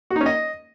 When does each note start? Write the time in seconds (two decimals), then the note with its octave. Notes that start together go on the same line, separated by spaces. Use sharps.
0.11 F#4
0.16 D#4
0.21 C#4
0.26 D#5